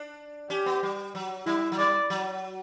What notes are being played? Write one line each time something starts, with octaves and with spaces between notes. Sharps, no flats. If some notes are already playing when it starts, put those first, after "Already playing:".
Already playing: D4
C#4 G4
B3
G3
F#3
G3 E4
F#3
G3 D5
F#3